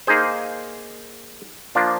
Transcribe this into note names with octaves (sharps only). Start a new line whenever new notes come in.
A#3 D#4 G#4 C5
F3 A#3 D4 F4